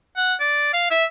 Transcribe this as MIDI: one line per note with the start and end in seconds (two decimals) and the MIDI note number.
0.16 0.34 78
0.40 0.72 74
0.73 0.90 77
0.91 1.05 76